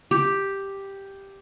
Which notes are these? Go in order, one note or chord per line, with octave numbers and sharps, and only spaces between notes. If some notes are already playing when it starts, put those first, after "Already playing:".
G4